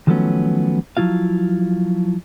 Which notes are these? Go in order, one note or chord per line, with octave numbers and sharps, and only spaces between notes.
D#3 F3 F#3 A3 B3 C#4
F3 F#3 E4 F4 F5